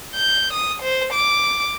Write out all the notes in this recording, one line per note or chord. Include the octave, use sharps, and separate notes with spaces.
G6
D#6
C5
D6